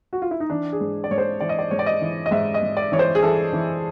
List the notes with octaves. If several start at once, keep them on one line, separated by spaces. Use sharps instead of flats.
F#4
F4
E4
D#4
E3 D4
G#4
G#2
D5
G#2 C#5
C5
E3 D5
D#5
D5
G#2 C#5
D5
D#5
E3
D#5
G#2 E5
D#5
G#2
D5
E3 C#5
C5
G#4
E3 A4
E3